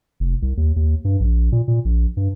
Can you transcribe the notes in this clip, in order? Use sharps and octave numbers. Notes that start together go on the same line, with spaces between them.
F1
C2
D#2
D#2
G2
A#1
A#2
A#2
A#1
G2